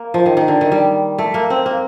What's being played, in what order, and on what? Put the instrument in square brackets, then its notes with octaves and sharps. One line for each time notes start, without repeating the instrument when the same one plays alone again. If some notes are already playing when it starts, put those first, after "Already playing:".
Already playing: [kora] A#3
F3
D#3
D#3
D3
D#3
G3
A3
A#3
C4
A#3